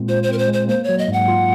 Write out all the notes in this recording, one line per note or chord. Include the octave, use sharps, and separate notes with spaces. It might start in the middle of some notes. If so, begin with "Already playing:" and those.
Already playing: A#2 G#3 C4
F4 C5
C5
C4 A#4
C5
G#3
C5
A#3 C5
C#5
F#3
D#5
G#2 F#5
F4